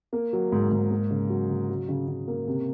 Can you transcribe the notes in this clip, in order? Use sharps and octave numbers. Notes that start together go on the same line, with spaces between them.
A#3
F#3
G#2
G#2
A#3
C#3
F#3
C#3
F#3
C#3
C#3
A#3
C3